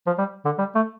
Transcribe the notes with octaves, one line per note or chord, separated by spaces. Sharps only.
F3
G3
D3
G3
A3